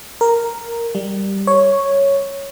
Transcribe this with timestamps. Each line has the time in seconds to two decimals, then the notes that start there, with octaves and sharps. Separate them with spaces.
0.21 A#4
0.95 G3
1.47 C#5